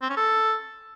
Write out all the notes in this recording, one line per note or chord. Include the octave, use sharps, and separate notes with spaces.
C4
C#4
A4